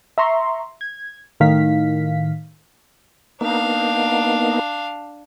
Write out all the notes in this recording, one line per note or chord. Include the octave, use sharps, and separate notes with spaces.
E5 A#5 C6 C#6
G#6
A2 D#3 F5 B6
A#3 B3 D4 D#4 F5